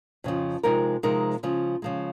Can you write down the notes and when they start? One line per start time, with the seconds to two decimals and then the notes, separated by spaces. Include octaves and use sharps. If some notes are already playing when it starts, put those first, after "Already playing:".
0.24 F2 C#3 F3
0.63 C3 F3 G#3 D#4 A#4
1.03 C3 F3 G#3 D#4 A#4
1.43 C#3 F3 G#3
1.82 C#3 F3 G#3